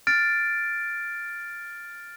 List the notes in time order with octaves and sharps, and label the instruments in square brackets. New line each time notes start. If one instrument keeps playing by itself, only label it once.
[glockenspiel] F6 A6 D7